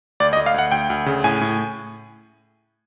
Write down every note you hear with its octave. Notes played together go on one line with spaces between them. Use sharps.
D2 D5
D#5
D2
F5
D2 F#5
D2 G5
D2
C#3
A2 G#5
A2